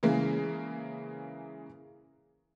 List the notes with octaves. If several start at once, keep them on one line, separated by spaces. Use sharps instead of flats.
C#3 E3 G#3 A#3